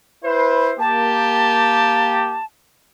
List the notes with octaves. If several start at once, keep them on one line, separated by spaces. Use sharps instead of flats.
E4 B4 C5
A#3 G4 A5